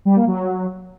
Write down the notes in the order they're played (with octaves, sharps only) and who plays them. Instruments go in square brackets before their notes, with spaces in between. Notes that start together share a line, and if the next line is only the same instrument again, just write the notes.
[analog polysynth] G3
A#3
F#3